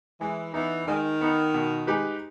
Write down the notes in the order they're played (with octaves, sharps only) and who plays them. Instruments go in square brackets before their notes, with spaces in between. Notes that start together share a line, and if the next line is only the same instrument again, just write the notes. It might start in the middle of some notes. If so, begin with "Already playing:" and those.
[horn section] E3 [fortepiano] G#3
[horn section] E3 [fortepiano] B3 D#4
[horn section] D#3 [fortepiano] G#3
[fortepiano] B3 D#4
B2
G#3 D#4 G4 B4